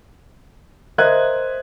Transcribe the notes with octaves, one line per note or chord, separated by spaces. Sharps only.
A#4 C5 D#5 E5 F#6 G#6